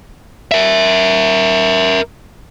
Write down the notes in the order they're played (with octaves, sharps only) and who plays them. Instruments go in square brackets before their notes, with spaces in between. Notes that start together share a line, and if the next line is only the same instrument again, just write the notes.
[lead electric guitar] A#4 E5